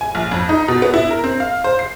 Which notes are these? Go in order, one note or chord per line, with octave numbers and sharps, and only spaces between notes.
G#5
A#1
F2
D#4
B2
B3
E4
A#4
C4
F5
C5
C7